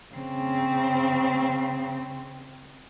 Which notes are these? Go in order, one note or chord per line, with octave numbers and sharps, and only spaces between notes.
C#3 C4